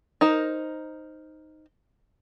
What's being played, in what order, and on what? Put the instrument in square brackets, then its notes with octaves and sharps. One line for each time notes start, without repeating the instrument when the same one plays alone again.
[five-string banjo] D#4 A#4 C5